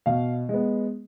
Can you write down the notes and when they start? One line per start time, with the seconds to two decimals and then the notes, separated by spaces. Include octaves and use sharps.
0.06 B2 F5
0.49 G#3 B3